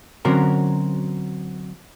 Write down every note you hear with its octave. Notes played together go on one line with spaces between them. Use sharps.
D3 F#3 C4 C#4 F#4 A#4